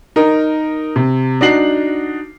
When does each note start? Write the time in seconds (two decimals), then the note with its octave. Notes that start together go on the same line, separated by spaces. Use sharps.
0.16 D#4 A#4
0.96 C3
1.41 D4 D#4 F#4 C7 F#7